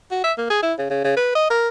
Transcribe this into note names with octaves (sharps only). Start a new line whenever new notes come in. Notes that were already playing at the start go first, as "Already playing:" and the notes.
F#4
E5
A#3
G#4
E4
C#3
C#3
C#3
B4
D#5
A#4